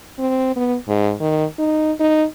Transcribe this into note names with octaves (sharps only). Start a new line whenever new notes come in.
C4
B3
G#2
D#3
D#4
D#4